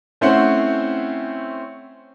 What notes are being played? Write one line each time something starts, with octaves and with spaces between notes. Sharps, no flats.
A3 C4 C#4 E4 C5 F#5